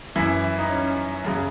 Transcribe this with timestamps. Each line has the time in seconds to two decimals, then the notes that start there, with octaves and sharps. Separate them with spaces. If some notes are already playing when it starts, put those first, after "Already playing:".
0.16 F#2 E3 E4
0.58 D#4
0.70 C#4
1.25 F#2 C#3 F#3